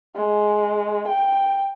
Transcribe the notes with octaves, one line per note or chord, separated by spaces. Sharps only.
G#3
G5